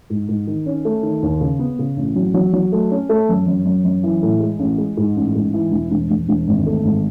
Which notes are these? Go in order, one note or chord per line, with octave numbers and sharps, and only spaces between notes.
G#2
G#2
D#3
C#4
A3
D#3
D#2
C#3
B3
C#3
A1
F#3
F#3
F#3
A3
C#4
A3
F#2
F#2
F#2
F#2
E3
A2
G#3
A1
G#3
G#2
A1
G#2
E3
E1
E1
E1
E1
G#1
A3
G#1